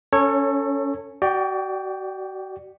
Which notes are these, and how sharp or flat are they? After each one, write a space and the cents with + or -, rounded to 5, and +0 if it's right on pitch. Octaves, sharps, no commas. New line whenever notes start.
C#4 +15 A4 +25 C#5 -15
F#4 +35 D5 +15 G5 +0